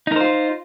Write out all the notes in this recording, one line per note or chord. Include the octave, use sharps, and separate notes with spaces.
D#4 F4 A#4 C5